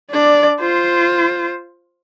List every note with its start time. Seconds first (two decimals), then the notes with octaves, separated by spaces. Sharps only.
0.11 D4 D5
0.61 F4 C5